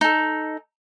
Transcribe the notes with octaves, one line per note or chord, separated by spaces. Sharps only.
D#4 A4